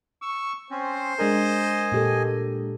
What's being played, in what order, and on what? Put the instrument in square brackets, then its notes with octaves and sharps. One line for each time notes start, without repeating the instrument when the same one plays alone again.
[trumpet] C#6 [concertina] E6
[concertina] C4 C#4 [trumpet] C5
[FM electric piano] G#3 D4 A#4 [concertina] D#5 G#5
[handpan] A#2 G4 A4